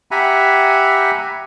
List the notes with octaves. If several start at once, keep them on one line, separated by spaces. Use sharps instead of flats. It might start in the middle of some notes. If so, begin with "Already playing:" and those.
G4 E5 F#5 G#5 A#5 B5